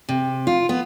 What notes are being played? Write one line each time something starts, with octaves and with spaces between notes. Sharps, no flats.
C3
F4
B3